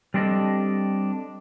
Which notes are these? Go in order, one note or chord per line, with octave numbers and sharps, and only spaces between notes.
G3 C4 D4 A4 D#5